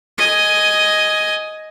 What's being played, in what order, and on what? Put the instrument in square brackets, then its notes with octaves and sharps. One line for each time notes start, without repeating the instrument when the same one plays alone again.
[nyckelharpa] D#5 G#5